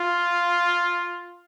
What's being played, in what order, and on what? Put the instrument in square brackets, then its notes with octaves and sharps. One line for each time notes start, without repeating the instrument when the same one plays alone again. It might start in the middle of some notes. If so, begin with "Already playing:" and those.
Already playing: [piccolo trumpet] F4